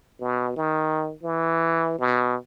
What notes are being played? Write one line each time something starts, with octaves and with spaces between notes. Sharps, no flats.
B2
D#3
E3
B2